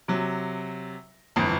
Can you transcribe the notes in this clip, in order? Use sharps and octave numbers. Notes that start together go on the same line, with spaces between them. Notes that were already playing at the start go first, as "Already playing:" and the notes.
C3 F#3
G1 F2 E3